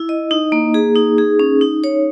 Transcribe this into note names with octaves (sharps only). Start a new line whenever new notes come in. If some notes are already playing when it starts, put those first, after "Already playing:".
Already playing: E4
D#5
D#4
A#3
G#4
D#4
G#4
C#4
D#4
C#5